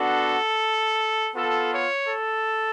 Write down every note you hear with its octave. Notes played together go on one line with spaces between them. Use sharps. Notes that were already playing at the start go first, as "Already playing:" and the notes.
Already playing: B3 D4 F#4 A4
B3 F4 A4
C#5
A4